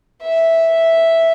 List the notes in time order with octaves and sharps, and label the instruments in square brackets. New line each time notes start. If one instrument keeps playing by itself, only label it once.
[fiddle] E5